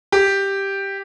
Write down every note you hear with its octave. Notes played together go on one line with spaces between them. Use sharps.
G4